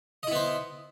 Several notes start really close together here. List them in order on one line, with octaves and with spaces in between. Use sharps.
D#5 E4 B3 C5